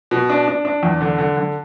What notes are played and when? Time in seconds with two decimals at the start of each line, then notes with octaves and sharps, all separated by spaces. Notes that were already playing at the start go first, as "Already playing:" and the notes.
0.11 B2
0.30 D4
0.48 D4
0.65 D4
0.83 E2
1.01 D3
1.18 D3
1.37 D3